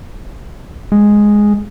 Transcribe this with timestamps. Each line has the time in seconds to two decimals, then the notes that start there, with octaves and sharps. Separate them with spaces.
0.92 G#3